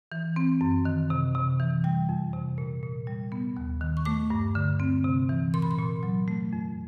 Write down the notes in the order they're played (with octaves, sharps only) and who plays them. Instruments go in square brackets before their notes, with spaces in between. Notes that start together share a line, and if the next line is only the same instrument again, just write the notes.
[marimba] E3
C4
F#2
D#3
C3
C3
E3
G3 G5
F2
C3
A#2
A#2
G3
B3
D#2
D#3
C#6
A3 D6
G2
D3
C4
C3
E3
A#2 C6
B5
C6
A#2
F#3
A3
F2